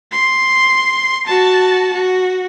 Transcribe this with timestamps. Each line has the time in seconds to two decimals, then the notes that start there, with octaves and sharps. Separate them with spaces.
0.12 C6
1.26 F#4 A5
1.94 F#4